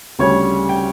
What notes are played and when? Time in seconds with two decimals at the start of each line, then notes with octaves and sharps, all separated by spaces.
0.19 D2 C#3 G3 C#5
0.69 G5